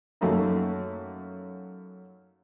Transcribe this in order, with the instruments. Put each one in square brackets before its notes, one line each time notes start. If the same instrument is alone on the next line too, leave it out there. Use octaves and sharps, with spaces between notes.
[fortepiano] F#2 A3 A#3 D#4